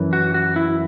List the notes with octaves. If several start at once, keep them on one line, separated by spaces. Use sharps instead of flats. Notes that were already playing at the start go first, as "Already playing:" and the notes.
Already playing: F#2 E3
F#4
F#4
E4